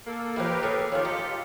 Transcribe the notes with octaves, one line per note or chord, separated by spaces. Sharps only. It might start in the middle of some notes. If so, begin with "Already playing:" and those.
A#3 A4
F3 G#3 E4 G4 A#4 B4
A2 A#3 G#4 A4
D#3 C#4 F4 G4 A4
G#3 A4 D#5 A#5